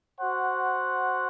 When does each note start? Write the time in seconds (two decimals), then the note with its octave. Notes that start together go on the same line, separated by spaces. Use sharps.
0.19 F#4 C5 F#5